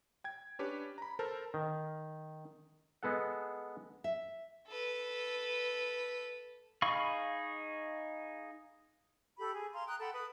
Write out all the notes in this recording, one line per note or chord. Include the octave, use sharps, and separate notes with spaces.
G5 G#6
C#4 D4 G4 B4 C#5
A#5 B5
A4 A#4 C5 A5
D#3
G#3 B3 A4 F#5
E5
A4 B4
D#4 G#4 F5 B5 C#6
G4 A4 B5
G#4
F5 A#5 C6
G5 A#5 D#6 F#6
A4 F#5 G5 B5
B4 D#6